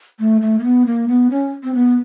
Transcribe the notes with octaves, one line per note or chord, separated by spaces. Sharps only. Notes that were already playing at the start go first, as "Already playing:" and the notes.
A3
A3
A#3
B3
A#3
B3
C#4
C4
B3